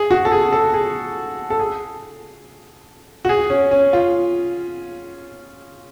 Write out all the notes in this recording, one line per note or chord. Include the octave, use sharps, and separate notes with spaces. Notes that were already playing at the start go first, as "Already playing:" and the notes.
Already playing: G#4
F#4
A4
G#4
A4
G#4
A4
G#4
F#4
G#4
C#4
C#4
F4